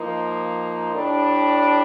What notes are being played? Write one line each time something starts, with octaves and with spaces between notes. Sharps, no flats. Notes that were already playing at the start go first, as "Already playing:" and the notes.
Already playing: F3 A#3 D#4
A2 G3 D4